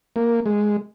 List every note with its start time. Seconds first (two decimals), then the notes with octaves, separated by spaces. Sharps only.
0.16 A#3
0.46 G#3